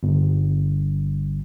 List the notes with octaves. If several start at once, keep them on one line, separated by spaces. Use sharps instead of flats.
G1